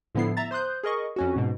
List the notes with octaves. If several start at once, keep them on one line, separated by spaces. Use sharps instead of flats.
A2 D3 F3 B3 E4 C7
E5 A#5 A6
C5 C6 D#6 F#6 G6
G#4 A#4 D#5 C#6
F2 C#4 F#4
G#2 B2